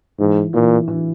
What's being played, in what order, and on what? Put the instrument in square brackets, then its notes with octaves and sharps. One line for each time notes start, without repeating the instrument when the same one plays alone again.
[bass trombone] G#2 [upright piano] E3
[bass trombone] A#2 [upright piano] E3
[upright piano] E3